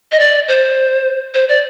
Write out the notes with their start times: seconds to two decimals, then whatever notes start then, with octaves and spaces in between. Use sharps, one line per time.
0.12 D#5
0.19 D5
0.48 C5
1.34 C5
1.49 D5